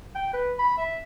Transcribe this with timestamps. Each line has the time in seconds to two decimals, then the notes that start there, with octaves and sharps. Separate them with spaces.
0.15 G5
0.33 B4
0.59 B5
0.78 E5